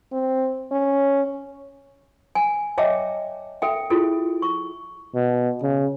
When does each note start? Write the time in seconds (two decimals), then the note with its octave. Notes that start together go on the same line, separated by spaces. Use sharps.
0.12 C4
0.72 C#4
2.35 G#5
2.78 C#5 D#5 E5 G5 A5 D6
3.62 A4 E5 G5
3.90 E4 F4 G#4 A4
4.42 C#6
5.15 B2
5.62 C#3